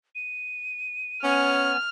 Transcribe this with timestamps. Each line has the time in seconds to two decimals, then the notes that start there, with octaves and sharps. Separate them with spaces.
0.15 D#7
1.23 B3 C#4 G#5 F6